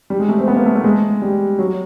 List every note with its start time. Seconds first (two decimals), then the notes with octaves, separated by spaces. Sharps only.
0.10 G3
0.20 G#3
0.29 A3
0.38 C4
0.48 B3
0.56 A#3
0.65 A3
0.76 A3
0.84 G#3
1.22 G3
1.59 F#3